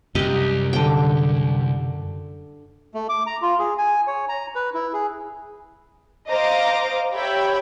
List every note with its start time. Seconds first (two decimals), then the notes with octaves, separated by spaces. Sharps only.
0.15 C2 F#2 G4 D#5
0.73 D3 G5
2.94 A3
3.09 D6
3.27 A#5
3.42 F4
3.59 G#4
3.78 G#5
4.07 C#5
4.29 A#5
4.55 B4
4.74 E4
4.93 G#4
6.29 C5 D#5 F5 A#5 D6
7.12 G4 C#5 E5 G5 B5